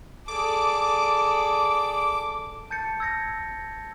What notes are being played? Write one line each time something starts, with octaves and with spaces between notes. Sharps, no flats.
G#4 A4 D5 D6
A5 G6 A6 C#7
E6 G#6 A#6 C#7